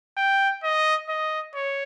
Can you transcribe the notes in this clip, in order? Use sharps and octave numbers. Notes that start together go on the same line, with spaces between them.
G5
D#5
D#5
C#5